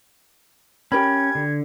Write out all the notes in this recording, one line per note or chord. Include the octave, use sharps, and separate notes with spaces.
C#4 G4 A#4 B5 G#6
D3